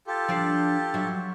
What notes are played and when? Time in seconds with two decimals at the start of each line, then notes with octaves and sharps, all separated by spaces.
0.07 F4 G4 A4
0.28 F3 D4 F5
0.94 F#3 E5